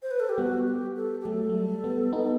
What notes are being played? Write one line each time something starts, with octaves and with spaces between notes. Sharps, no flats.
C5
B4
A4
G4
G3 B3 F#4
G4
A4
G4
F#3 A3 A4
A3
G3
G3 B3
B3 D#4